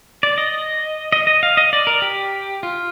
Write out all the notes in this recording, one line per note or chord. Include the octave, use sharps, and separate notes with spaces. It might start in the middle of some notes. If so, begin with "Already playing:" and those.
D5
D#5
D#5
D#5
F5
D#5
D5
A#4
G4
F4